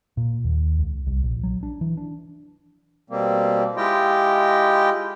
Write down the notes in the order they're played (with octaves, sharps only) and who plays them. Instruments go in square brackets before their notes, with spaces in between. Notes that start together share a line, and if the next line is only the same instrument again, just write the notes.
[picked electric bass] A#2
D#2
C#2
C2
A#1
F#3
D4
E3
D4
[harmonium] B2 G3 A#3 C4
G#3 E4 F4 G4 D#5 G5